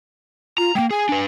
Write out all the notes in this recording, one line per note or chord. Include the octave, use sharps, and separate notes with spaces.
F4 A#5
G#3 A#3 G5
G#4 G#5
D4 B4